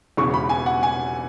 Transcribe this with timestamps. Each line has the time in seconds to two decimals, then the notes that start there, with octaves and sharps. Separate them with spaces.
0.17 E1 E2 C#3 E3 C#6
0.34 B5
0.49 G#5
0.66 F#5
0.83 G#5